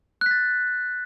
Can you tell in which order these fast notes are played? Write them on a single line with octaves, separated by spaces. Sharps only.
F#6 B6 A6